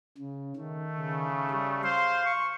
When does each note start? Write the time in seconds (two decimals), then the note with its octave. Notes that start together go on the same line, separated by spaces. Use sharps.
0.17 C#3
0.56 D#3 A3
0.97 C#3
1.50 G3
1.83 C5 F5 C6
2.25 C#6